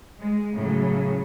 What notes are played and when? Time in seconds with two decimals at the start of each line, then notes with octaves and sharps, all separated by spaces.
0.20 G#3
0.56 A2 C#3 F#3